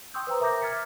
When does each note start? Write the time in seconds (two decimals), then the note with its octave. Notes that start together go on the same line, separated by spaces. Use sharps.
0.14 G5 C6 C#6 D#6 E6 G6
0.27 B4 C5 G5 A#5
0.40 A#4 E5 A#5 D6 G6 A#6
0.62 F6 G#6 A6 B6 C#7